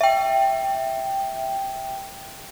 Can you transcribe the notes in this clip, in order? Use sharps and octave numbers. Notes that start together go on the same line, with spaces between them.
E5 G5